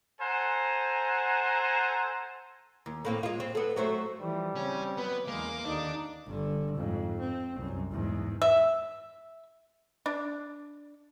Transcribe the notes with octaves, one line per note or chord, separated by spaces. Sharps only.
A4 C5 F#5 G#5 A#5
D#2
A2 A#3 C4
G#3 F4
C4
B3 A4
F#3 A3 C5
E3 F3 G3
C#3 C4 C#4
F#3 B3 B4
E2 C#3 G#3 A#3 F5 D6
D#2 D3 D4 D#4
G1 D3
F2 G#2
C4
C2 F#2
E2 G#2
E5
D4